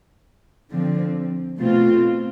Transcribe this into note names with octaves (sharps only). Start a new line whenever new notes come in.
D3 F3 C4
B2 A3 C4 F4